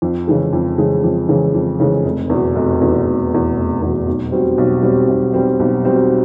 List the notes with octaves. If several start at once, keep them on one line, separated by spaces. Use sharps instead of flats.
F2
C#3 E3 G#3
F2
C#3 E3 G#3
F2
C#3 E3 G#3
F2
C#3 E3 G#3
F1
E2 B2
F1
E2 B2
F1
E2 B2
F1
E2 B2
B1
B2 G3 C4
B1
B2 G3 C4
B1
B2 G3 C4
B1
B2 G3 C4